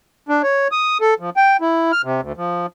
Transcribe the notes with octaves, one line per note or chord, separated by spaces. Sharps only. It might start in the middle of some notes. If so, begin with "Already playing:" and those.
D4
C#5
D#6
A4
F3
G5
E4
F6
C3
D2
F3